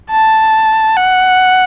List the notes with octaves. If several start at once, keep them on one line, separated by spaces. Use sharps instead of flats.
A5
F#5